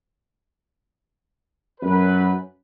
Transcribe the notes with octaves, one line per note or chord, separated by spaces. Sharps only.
F#2 B4